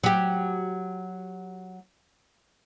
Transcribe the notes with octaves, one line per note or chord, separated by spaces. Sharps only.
F#3 G4